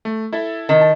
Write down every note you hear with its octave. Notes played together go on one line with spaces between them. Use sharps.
A3
E4 A4 E5
D#3
A5